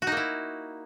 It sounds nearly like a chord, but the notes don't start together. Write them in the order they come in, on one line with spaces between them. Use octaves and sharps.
F#4 D#4 A#3 E4